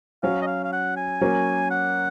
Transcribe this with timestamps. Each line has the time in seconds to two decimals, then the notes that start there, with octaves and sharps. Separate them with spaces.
0.23 F#3 C#4 F#4 F5
0.42 D#5
0.47 F5
0.64 F5
0.73 F#5
0.97 G#5
1.21 F#3 A#3 C#4
1.71 F#5